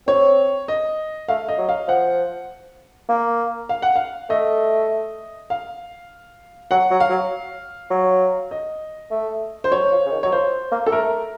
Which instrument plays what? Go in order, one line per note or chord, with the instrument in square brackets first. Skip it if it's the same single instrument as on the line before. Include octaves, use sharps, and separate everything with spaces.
[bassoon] C4 [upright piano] C#5
[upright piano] D#5
[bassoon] A3 [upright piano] F5
[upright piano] D#5
[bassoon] F#3
[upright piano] F5
[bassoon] F3 [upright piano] F#5
[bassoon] A#3
[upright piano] F5
F#5
F5
[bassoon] A3 [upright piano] D#5
[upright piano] F5
[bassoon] F#3 [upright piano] F#5
[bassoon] F#3
[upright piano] F5
[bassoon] F#3
F#3
[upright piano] D#5
[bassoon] A3
[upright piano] C5
[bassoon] F#3 [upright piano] C#5
[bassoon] F3
C#3
D#3
[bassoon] F#3 [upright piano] C#5
[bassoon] F3 [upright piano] C5
[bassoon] A#3
[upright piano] A4
[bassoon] A3 [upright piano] A#4